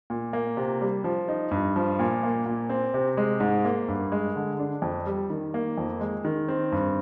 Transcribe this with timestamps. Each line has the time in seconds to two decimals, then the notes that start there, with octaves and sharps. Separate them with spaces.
0.10 A#2
0.33 A#3
0.57 C3
0.81 G3
1.04 F3
1.28 D#4
1.51 G2
1.76 F3
1.99 A#2
2.23 A#3
2.46 A#2
2.69 C4
2.94 C3
3.17 G#3
3.40 G#2
3.65 A#3
3.88 G2
4.12 G#3
4.36 D3
4.59 D4
4.82 F2
5.06 G3
5.30 D#3
5.54 A#3
5.78 F2
6.01 G#3
6.25 D#3
6.48 C4
6.72 G2